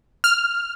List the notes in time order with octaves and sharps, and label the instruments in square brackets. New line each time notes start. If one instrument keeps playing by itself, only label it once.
[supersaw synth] F6